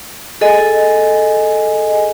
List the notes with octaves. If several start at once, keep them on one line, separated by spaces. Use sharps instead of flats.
G#4 A4 D#5 G#5